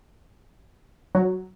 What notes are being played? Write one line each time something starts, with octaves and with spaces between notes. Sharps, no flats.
F#3